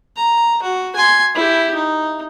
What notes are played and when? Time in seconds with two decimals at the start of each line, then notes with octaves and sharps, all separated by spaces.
0.16 A#5
0.63 F#4
0.96 G#5 C6
1.35 E4 G4
1.75 D#4